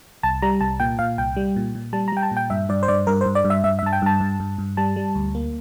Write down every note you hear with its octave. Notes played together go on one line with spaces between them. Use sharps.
C2 A5
G3 A#5
C2 A5
A#2 G5
A#2 F5
C2 G5
G3
A#2
A#2
G3 A5
A#5
G3 G5
A5
A#2
G5
G2 E5
G2 D5
C5
G2 D5
G2 A#4
C5
G2
D5
G2
E5
G2 E5
E5
G2 A5
G5
G2 A5
G2
G2
G2
G3 A5
G3
D2
A#3